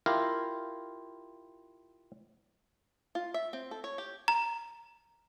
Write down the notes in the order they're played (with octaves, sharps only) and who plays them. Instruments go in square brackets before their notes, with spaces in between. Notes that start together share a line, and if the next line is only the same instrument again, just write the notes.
[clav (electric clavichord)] E4 F4 G4 A#4 F5
[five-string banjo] F4
E5
C4
A4
C#5
G4
[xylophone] A#5